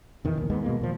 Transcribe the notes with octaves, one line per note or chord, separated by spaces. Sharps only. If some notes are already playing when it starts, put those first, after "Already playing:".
E2 D#3 E3
A#1 D#2
D#2 G#2 G#3 B3
B2 G#3 A#3
D#2 A#2 F3